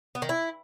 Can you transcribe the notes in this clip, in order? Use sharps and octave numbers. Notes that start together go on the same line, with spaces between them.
B3
D#3
E4